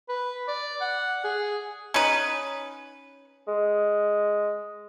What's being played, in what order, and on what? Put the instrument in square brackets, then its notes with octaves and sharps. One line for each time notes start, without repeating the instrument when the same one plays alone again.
[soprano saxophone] B4
D5
F#5
G#4
[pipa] C#4 D#4 B4
[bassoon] G#3